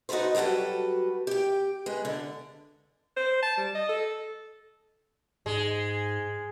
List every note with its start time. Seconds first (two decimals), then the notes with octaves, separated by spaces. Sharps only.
0.09 D#4 F#4 A4 B4 C5
0.35 F#3 G3 F#4 A4 B4
1.27 G4 G5
1.86 G#3 B4
2.05 D3
3.17 C5
3.43 A5
3.57 G3
3.75 D#5
3.89 A4
5.46 G#2 G#3